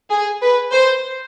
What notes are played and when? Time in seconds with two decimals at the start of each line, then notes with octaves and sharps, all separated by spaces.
0.11 G#4
0.42 B4
0.73 C5